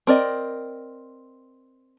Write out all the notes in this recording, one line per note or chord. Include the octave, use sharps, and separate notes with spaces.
C4 A#4 D5 D#5